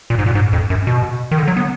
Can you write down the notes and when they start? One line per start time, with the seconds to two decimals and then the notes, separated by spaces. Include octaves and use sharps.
0.10 A#2
0.19 G#2
0.26 A#2
0.35 G#2
0.53 F2
0.70 F#2
0.87 B2
1.31 D#3
1.38 D3
1.48 F#3
1.57 B3